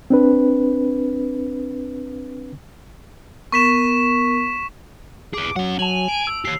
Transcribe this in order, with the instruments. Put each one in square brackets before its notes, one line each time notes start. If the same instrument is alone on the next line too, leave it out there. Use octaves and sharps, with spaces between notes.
[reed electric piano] C4 D4 B4
[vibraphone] B3 A#4 [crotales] C#6 B6 E7
[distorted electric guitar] G#4 B4 [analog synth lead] D6
[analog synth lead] F#3 [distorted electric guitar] C#4 F#5
[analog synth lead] F#3 [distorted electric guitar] G#5 [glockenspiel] A5 F7 F#7
[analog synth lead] D7
[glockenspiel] E6
[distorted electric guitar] G4 C#5 [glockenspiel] C7